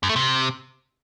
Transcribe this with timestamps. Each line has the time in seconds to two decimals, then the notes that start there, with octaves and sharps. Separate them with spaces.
0.03 F#2
0.09 A3
0.16 C3